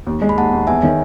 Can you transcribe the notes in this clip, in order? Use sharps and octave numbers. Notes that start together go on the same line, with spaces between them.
D#2
G#3
B5
D#2 F#5 A5
D#2
E2 E5 G#5
D#3 C#5 E5